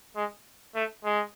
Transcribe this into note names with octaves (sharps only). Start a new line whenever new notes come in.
G#3
A3
G#3